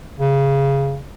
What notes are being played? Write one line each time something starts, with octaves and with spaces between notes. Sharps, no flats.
C#3